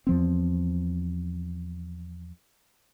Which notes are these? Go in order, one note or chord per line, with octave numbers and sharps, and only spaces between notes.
E2 F3 C4